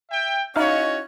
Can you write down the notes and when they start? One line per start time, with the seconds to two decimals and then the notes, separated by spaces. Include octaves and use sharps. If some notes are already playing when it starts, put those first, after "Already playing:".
0.11 E5 G5
0.56 C#4 D#4 E4 F#4 C#5 D#5 F5